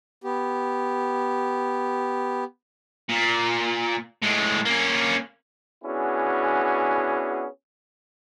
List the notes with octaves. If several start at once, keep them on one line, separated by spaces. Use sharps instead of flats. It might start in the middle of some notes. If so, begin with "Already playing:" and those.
B3 G4
A#2
A2 G#3
A#3 C#4
B3 C#4 D4 E4 F#4 G#4